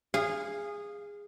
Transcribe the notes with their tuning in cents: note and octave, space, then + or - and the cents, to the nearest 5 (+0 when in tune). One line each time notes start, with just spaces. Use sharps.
G#4 -15 F5 +0